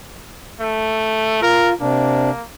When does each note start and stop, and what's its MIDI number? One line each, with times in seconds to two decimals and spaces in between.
0.61 1.38 57
1.42 1.73 65
1.42 1.72 70
1.81 2.30 48
1.81 2.45 58
1.81 2.30 62